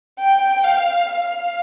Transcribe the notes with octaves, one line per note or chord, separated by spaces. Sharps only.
G5
F5
F5